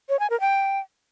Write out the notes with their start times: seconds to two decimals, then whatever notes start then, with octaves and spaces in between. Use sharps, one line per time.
0.09 C#5
0.20 G#5
0.30 A#4
0.40 G5